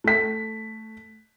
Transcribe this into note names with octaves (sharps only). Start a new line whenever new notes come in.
A3 B6